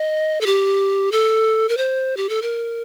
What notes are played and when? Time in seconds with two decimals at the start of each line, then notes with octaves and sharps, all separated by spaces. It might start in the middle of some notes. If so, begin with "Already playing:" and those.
Already playing: D#5
0.41 A4
0.46 G4
1.12 A4
1.69 A#4
1.77 C5
2.17 G4
2.29 A4
2.42 A#4